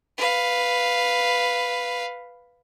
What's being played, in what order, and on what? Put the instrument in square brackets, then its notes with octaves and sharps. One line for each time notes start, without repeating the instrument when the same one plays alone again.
[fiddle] B4 F5